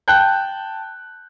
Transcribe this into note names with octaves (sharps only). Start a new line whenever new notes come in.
G5 A5 F#6 G6